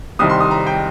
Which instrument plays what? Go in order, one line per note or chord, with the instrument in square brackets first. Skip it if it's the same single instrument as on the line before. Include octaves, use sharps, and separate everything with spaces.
[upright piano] C2 C3 D#3 G3 D#6
C6
D#6
A#5
G5